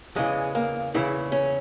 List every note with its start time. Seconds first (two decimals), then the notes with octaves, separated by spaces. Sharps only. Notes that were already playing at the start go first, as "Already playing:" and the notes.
0.16 E2 C#3 E3 G#3
0.55 A#3
0.94 E2 C#3 E3 E4
1.32 C#4